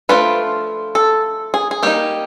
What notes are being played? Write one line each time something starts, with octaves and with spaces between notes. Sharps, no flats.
F3 A3 D4 F4 B4
A4
G#4
G#4
G3 A#3 D#4 G4